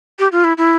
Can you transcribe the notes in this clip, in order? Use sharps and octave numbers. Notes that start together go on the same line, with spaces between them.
G4
F4
E4
E4